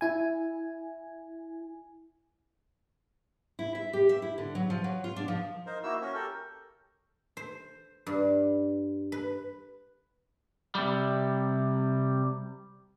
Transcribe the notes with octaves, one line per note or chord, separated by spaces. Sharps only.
E4 G#5
E4
E5
G4
E5
E4
D3
F#3
F3
F#3
F4
D4
F3
D#4 A#4 C5
A#3 E4 F#4 E6
C#4 F#4 A#4
G4 A4 A#4
C5
G2
B4
C3 G3